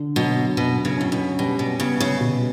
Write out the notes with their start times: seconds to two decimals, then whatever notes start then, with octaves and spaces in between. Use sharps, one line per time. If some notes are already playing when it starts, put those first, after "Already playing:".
Already playing: D3
0.16 B2 F#3
0.57 F#2 B2
0.85 C#3
0.98 A2 C#4
1.12 B2
1.39 B2 G3
1.59 B2
1.79 C#3 B3
2.00 C#3
2.21 B2